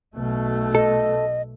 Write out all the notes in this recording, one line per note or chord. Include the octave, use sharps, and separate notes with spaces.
B1 B2 A3
A4 D#5